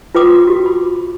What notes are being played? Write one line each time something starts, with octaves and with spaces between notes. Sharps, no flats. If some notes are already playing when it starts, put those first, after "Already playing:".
F4 B4 G5 D6 D#6
F#4 G4
B5